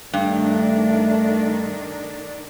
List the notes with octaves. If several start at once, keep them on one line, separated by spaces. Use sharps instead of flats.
G2 D#3 A3 D4